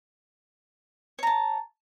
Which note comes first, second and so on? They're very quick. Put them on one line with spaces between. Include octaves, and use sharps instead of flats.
C#5 A#5 A5